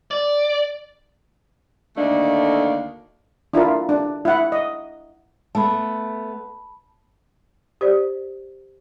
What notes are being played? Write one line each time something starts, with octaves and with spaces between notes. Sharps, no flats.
D5
D2 D#3 A3 A#3 D4
D4 E4 F4 A#4
D4
E4 F#5
D#5
A3 B3 A5 B5
G4 C5 D5